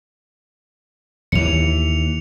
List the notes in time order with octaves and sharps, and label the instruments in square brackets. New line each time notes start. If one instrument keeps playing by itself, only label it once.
[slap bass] D#2 E3 [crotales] C#7 F7